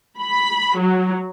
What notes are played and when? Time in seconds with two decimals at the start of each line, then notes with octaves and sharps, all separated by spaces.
0.20 B5
0.77 F#3